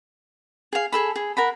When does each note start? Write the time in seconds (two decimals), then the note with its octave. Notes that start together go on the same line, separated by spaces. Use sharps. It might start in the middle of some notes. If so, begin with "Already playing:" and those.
0.73 G#4 F5
0.92 G#4 A4 B5
1.16 G#4
1.37 A#4 F#5 B5